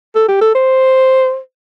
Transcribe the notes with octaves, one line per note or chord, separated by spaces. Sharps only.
A4
G4
A4
C5